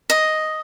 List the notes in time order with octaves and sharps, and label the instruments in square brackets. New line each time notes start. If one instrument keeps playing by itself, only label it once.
[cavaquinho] D#5